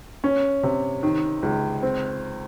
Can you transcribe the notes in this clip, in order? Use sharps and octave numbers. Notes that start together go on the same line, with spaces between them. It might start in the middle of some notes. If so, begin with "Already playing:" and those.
C#4
C3
D#3
C#2
C4